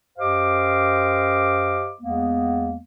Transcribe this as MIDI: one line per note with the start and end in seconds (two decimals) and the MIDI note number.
0.18 1.91 42
0.18 1.91 67
0.18 1.91 72
0.18 1.91 75
0.18 1.91 77
0.18 1.91 86
2.01 2.77 40
2.01 2.77 56
2.01 2.77 58
2.01 2.77 59